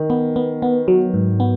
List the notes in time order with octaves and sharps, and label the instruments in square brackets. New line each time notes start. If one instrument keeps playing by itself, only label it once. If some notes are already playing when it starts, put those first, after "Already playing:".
Already playing: [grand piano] D#3
[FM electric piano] B3
B3
B3
F#3
G#2
B3